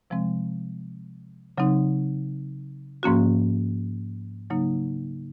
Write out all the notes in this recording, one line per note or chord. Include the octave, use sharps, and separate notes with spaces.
C3 F3 G#3 C4
C#3 F#3 C4 D#4
G#2 F3 A#3 C#4 F#4
C#3 F#3 A#3 D#4